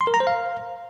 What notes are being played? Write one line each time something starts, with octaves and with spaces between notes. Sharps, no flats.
C6
A#4
A#5
C5
F5